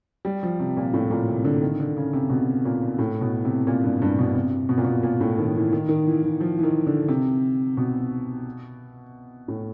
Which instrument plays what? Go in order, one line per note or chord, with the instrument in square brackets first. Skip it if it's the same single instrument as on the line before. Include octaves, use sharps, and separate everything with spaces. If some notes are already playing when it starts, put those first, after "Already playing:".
[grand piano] G3
F3
C3
A#2
A2
A#2
C3
D3
D#3
D3
C#3
C3
B2
A#2
A2
B2
C3
A#2
G2
G2
B2
C3
B2
A#2
B2
A#2
A2
D#3
E3
D#3
D#3
E3
E3
F3
E3
D#3
D3
C3
B2
A2